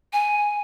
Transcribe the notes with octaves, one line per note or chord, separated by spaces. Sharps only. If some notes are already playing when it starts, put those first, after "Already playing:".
G#5